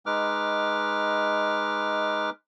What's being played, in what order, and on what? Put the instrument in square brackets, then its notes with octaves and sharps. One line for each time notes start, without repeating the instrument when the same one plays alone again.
[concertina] G#3 D#4 B4 D6 F6